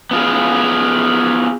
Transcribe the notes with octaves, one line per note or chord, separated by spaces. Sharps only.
B3 F4 G#4